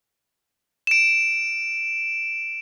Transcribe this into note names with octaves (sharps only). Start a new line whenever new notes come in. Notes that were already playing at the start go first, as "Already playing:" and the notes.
D7 E7